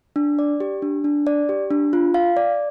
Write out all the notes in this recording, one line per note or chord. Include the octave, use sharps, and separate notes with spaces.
D4
D5
G4
D4
D4
D5
G4
D4
F4
F5
D5